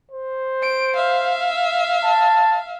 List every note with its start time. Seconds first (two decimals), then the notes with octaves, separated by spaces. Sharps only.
0.11 C5
0.62 D7
0.96 E5 F5
2.04 A5